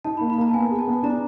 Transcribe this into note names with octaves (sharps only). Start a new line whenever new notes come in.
D#4 A5
B5
A#3
B5
A#3 A#5
A5
B3 G#5
G#4
A5
B3
D4 A#5